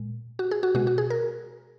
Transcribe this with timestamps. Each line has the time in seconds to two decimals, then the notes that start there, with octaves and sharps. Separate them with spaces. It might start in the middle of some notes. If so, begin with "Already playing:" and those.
Already playing: A#2 G#3
0.39 F#4
0.51 G#4
0.63 F#4
0.75 B2 G#3 F#4
0.87 F#4
0.98 G#4
1.10 A#4